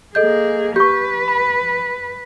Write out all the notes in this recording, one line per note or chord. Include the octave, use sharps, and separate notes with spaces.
A#3 G#4 A4 D#5 G6
G4 B4 C#6 G6
B5